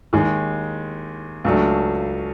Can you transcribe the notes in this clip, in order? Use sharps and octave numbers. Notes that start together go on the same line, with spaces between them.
D#2 D#3 G#3
C#2 C#3 F#3 A3 D4